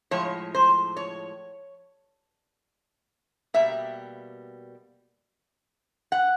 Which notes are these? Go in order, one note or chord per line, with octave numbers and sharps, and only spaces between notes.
A2 F3 G#3 C#5
C5
C#5
B2 G3 A#3 E5
F#5